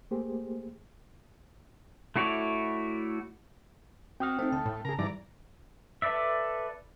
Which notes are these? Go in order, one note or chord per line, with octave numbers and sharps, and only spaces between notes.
A3 A#3 G4 G#4 C5
A3 E4 F#4 C#5 D5
C4 F#4 G5 D#6 F6
A3 C4 D#4
D2 A5
A2
C#3 G#4 A#4 A#5
G#2 E3 G3 D5 A#5
A4 B4 D5 E5